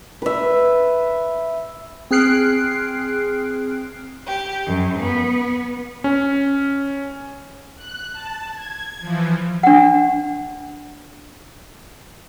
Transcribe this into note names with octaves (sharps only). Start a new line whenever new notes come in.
B4 E5
C4 G#4 F6 F#6 C7 D7
G4
F#2
B3
C#4
F#6
A5
G#6
E3 F3
D4 F#5